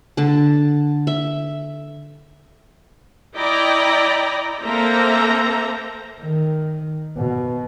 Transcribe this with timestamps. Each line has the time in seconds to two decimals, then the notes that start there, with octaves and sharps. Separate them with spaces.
0.17 D3 A5
1.07 E5
3.35 E4 D5 D#5 G5 A#5 B5
4.63 A#3 C4 A4 C5 E5 A#5
6.22 D#3
7.17 B2